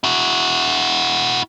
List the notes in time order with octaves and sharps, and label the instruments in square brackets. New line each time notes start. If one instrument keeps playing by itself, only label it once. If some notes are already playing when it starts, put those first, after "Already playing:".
[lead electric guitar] E4 F#4